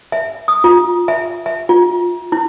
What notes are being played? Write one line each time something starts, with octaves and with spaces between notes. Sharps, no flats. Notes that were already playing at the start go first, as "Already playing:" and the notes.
E5
D#6
F4
E5
E5
F4
E4